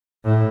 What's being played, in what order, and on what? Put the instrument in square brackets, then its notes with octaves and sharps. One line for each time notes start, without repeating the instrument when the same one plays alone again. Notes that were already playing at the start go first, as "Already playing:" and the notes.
[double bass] A2